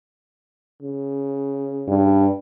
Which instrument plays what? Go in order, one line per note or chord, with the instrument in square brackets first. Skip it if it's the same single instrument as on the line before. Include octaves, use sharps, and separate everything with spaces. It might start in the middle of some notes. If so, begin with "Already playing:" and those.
[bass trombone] C#3
[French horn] G2